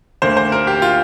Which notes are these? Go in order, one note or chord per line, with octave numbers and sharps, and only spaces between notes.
D2 D3 A#3 C5
C5
A#4
G4
F4